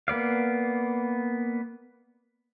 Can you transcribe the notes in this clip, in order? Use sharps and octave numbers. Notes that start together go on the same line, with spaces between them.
A#3 B3 D5 F5